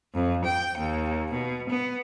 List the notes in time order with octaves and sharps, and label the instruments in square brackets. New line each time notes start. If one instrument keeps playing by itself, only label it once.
[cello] F2
G5
D#2
B2
B3